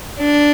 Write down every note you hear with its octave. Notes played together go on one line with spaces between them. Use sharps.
D4